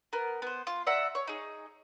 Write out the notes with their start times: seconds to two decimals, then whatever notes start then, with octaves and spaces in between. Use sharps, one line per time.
0.13 B3 A#4
0.42 B3 C5
0.67 F4
0.87 D5 E5 F#5 A#5
1.15 C#5
1.28 D#4 G#4